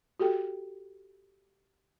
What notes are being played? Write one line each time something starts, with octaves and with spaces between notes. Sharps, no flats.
F#4 G4 A4 G5